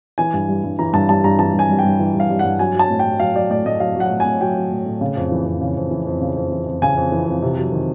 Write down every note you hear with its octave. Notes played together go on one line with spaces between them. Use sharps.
E3 G#5
G2
G3
G2
E3 A#5
G2 A5
G3 A5
G2 A#5
E3 A5
G2 G#5
G3
G5
G2
E3
G2
F5
G3
F#5
G2
F#3 G#5
F#3 A5
A2
G5
A2
F#3 F5
F#3 D5
A2 D5
A2 D#5
F#3 F5
F#3 F#5
A2
A2 G#5
F#3 G5
F#3
A2
A2
C#3
F2
E3
F2
C#3
F2
E3
F2
C#3
F2
E3
F2
C#3 G#5
F2
E3
F2
C3
F#3
D#3